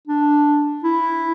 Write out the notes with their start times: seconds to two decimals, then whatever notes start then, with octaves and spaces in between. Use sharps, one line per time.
0.07 D4
0.83 E4